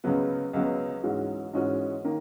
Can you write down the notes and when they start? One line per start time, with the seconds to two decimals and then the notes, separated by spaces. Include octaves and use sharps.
0.04 C#2 C#3 F#3 B3
0.53 C#2 C#3 F#3 B3
1.03 G#2 E3 G#3 C#4 F#4
1.53 G#2 E3 G#3 C#4 F#4
2.04 D#3 A#3